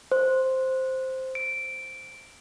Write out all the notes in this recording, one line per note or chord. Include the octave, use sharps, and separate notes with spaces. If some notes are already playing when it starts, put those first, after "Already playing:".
C5
D7